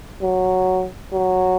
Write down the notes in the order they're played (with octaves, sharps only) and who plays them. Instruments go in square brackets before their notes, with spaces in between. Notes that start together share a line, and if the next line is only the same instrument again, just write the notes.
[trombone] F#3
F#3